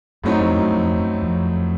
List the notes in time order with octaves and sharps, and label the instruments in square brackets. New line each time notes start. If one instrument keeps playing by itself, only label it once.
[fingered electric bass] F#2 [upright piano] A2 F#3 A3 C4 D#4
[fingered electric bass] F2
F#2
F2
F#2
F2